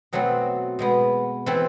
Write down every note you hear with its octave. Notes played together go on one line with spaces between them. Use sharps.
B2 F#3 A3 C4
B2 G#3 B3
E3 A3 C4